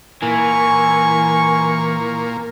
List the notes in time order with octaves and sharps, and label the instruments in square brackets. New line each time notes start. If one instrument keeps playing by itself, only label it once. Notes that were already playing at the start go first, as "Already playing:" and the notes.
[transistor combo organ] A#2 A#3 [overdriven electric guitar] E3 [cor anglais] G#5 [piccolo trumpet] C#6